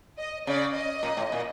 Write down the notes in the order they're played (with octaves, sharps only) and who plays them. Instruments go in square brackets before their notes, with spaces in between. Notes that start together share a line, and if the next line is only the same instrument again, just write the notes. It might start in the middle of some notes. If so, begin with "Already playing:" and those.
[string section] D#5
[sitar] C#3 [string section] D5
[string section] D#5
[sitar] A#2
A2
A#2